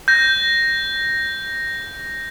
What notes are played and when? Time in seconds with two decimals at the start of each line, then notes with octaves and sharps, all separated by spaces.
0.08 G6 A#6